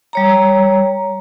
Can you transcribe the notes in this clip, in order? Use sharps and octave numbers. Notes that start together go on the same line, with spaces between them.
G3 C#5 A#5